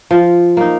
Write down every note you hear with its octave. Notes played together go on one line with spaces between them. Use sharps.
F3
A#3 D#4